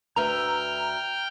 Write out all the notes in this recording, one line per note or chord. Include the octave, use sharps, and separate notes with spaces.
D2 B4 E5 G5 A#5 F6